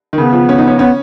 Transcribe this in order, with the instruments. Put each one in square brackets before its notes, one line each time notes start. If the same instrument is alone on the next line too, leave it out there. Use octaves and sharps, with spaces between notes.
[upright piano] D#3
[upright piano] C#3 [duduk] B3
[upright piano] F3
C#4
D#4
C#4
[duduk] B3 [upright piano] C#4